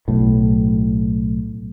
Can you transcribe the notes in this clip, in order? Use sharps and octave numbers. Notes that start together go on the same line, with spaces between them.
B1 A2